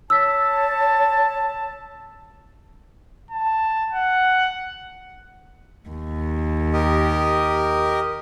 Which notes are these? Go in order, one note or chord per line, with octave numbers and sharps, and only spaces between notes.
C#5 A5 E6 B6
A5
F#5
D#2
G4 A#4 D#5